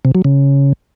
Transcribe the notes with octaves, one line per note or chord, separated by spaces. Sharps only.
C3
F#3
C#3